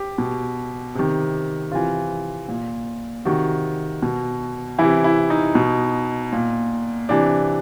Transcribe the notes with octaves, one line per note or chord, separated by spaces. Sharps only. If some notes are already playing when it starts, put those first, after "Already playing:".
Already playing: G4
B2
C3 D#3
C3 E3 F4
A#2
C3 D#3 F#4
B2
C3 E3 E4
E4
D#4
B2
A#2
C3 E3 D4